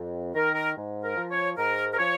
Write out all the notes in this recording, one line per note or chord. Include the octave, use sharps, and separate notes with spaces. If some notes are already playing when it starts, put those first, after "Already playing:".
Already playing: F2
D#3 A#4
A#4
G#2
A#4
F3
C#5
G#2 A#4
A#4
F3 C#5